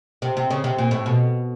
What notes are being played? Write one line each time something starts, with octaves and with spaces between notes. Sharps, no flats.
C3
C3
C#3
C3
A#2
A2
B2